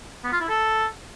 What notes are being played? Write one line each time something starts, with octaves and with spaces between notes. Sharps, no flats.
B3
F4
E4
A4